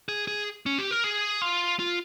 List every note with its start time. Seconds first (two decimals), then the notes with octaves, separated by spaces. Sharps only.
0.08 G#4
0.28 G#4
0.66 C#4
0.78 G4
0.91 A#4
1.04 G#4
1.42 F4
1.79 F4